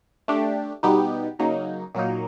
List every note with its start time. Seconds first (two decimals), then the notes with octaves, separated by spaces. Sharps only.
0.28 A3 D4 G4
0.83 B2 G3 B3 D#4 G4
1.39 C#3 F#3 A#3 D#4
1.95 A#2 F#3 A#3 D#4